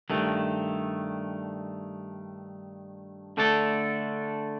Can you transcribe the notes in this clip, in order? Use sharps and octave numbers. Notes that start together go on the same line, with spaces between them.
G2 D#3 A3
D3 A3 D4 A4